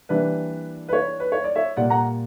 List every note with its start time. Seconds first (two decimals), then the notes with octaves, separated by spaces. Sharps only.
0.09 E3 G3 A#3 D4 B4
0.89 B4
0.93 C#5
1.20 B4
1.32 C#5
1.44 D5
1.55 C#5 E5
1.77 A#2 G3 A#3 D5 F#5
1.90 F#5 A#5